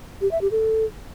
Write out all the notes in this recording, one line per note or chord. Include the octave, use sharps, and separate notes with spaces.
G4
E5
G4
A4